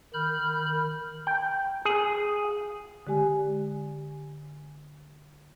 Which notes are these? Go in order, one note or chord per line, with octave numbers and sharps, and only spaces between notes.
D#3 B5 F6 G6
G5
G#4
D3 G#3 G4 G#5